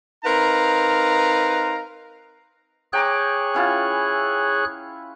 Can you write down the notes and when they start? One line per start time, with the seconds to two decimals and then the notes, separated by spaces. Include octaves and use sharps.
0.25 C4 D#4 A#4 B4 F5 A#5
2.93 G#4 C#5 G5 A#5 D6 F#6
3.54 C#4 E4 F4